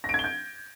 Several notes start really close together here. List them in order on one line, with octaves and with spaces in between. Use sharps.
A#6 D7 G#6 G7 G6